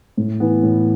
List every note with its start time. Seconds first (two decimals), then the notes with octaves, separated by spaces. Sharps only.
0.17 A2
0.40 E3 B3
0.63 A2